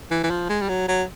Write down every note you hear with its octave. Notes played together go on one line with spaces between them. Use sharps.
E3
E3
F3
G#3
G3
F#3
F#3